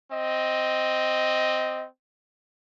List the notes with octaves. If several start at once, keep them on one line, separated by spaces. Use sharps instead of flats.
C4 D#5